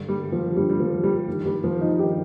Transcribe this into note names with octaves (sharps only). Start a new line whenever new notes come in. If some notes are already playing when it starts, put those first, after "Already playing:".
Already playing: G2 D3
G3
F3
G2 D3 G3
G3
F3
G3
G2 D#3
G3
F3
D#4
G2 D#3 G4